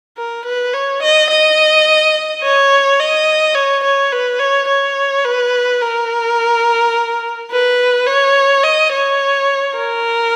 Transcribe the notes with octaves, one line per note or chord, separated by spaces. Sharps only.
A#4
B4
C#5
D#5
D#5
C#5
D#5
C#5
C#5
B4
C#5
C#5
B4
A#4
B4
C#5
D#5
C#5
A#4